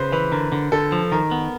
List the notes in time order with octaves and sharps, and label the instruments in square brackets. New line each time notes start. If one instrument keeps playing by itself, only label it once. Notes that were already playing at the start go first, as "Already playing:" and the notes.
Already playing: [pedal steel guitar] C#3 [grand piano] B4 C5
[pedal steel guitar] E3 [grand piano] B4
[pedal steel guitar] D3 [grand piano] A#4
[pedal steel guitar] D3
[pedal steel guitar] D3 [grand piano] A4
[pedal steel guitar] F3
[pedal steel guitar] D#3 [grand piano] A#4
[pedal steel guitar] B3